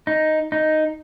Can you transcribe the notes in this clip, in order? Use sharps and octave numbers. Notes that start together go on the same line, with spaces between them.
D#4
D#4